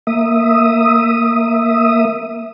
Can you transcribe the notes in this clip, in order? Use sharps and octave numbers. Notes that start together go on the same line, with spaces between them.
A#3 E5 D#6